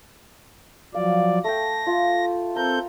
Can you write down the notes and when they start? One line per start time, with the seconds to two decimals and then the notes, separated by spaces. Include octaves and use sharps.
0.94 F3 F#3 D5 F5
1.44 A3 G5 A#6
1.87 F4
2.56 C4 A4 A#4 G6